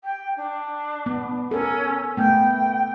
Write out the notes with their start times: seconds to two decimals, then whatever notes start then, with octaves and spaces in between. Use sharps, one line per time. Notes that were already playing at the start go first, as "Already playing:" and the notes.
0.04 G5
0.36 D4
1.06 B3
1.51 C#4 A4 A#4
2.17 A3 B3 G5